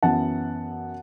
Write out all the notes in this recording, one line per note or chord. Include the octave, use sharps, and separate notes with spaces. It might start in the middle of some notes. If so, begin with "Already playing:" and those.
F#2 E3 B3 F#5 A5